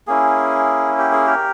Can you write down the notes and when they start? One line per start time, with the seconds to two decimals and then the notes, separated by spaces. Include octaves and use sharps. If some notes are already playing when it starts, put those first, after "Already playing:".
0.07 A#3 C#4 E4 G#4
0.98 G4
1.12 G#4
1.26 G4 A#4